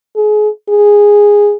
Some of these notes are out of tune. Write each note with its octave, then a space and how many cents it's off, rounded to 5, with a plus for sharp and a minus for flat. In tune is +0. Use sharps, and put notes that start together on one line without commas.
G#4 +30
G#4 -10